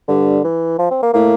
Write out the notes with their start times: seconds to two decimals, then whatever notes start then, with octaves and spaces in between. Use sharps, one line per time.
0.08 G2 D3
0.44 E3
0.79 F3
0.91 C4
1.03 A#3
1.14 A2 A#3